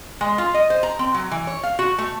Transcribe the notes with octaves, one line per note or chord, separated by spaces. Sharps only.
G#3
F4
D#5
C5
A#5
C4
F#3
E3
C#5
F5
F#4
A3